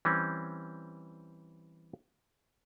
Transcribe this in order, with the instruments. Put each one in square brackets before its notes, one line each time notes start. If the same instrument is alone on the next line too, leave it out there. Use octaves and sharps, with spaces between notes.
[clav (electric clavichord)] E3 G3 C4 C#4